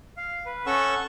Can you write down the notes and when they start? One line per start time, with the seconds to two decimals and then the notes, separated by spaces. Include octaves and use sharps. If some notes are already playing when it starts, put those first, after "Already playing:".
0.17 F5
0.45 B4
0.66 C#4 A4 F#5 C#6 E6